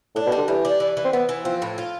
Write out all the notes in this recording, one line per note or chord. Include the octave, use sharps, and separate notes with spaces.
A2 D4
B2
G3
D3
E3 G3
D4
E3
E3
C4
E3 B3
E3
F3 C4
A2
F4